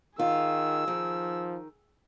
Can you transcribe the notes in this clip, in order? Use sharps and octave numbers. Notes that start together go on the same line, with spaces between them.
D#3 F4 G#4 E6
D#3 F3